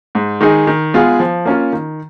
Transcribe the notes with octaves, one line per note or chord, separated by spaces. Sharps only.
G#2
D#3 G#3 D#4 G#4
D#3
G#3 B3 F4 G#4
F3
A#3 C#4 F4
D#3